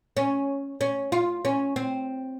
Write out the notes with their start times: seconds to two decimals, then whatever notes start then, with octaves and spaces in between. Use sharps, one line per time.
0.17 C#4
0.81 C#4
1.12 F4
1.45 C#4
1.76 C4